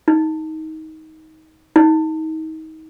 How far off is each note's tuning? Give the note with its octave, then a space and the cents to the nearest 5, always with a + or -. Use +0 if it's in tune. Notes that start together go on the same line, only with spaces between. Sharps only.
D#4 +20
D#4 +30